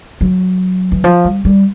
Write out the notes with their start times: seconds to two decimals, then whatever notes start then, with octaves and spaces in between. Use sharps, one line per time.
0.21 F#3
0.92 E3
1.04 F3
1.25 G3
1.45 G3